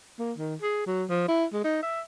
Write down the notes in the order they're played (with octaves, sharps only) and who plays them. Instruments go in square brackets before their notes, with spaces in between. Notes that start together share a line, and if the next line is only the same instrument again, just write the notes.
[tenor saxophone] A#3
D#3
G#4
F#3
F3
E4
G#3
D#4
E5